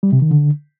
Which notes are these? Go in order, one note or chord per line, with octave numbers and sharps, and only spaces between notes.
G3
C3
D#3
D3